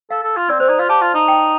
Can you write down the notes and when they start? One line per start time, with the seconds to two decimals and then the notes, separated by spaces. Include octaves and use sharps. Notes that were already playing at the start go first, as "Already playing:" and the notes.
0.11 A4 F5
0.23 A4
0.37 F4
0.50 C4 D5
0.60 C4 C5
0.69 D#4 D5
0.79 F4 F5
0.89 G4 A5
1.01 F4
1.14 D#4
1.28 G5